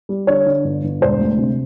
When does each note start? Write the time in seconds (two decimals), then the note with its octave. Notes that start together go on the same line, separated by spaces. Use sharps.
0.09 G3
0.27 D3 C#5
0.46 D3
0.64 G1
0.84 G1
1.01 E1 C5
1.20 D2
1.38 C3